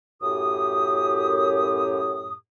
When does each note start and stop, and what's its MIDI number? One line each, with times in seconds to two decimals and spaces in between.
0.22 2.34 42
0.22 2.34 45
0.22 2.34 67
0.22 2.34 87